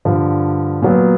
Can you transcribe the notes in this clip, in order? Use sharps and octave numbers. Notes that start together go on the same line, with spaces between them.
G2 D3 F3
A#2 F#3 B3